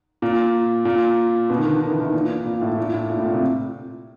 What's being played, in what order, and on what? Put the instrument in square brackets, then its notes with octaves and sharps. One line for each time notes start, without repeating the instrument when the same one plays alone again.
[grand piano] A#2
A#2
B2
D#3
D3
D#3
E3
D#3
A#2
A#2
A2
A#2
A2
A#2
A2
A#2
C3